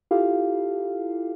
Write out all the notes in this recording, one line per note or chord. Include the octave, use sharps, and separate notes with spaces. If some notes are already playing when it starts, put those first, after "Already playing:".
E4 F4 G4 A4 F5